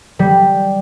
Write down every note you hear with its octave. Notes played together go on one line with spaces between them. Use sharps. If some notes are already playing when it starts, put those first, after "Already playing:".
G3